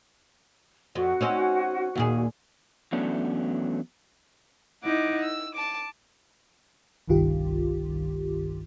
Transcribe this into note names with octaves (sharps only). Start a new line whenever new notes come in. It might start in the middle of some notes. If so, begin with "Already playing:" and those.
F2 F#4
C4 C#4 D#4
D#2 A#2 G#4
E2 F#3 A3 B3 C#4 D4
D#4 E4 F#5 D6
E6
A5 D6
G1 C2 G2 D#3 F4 G4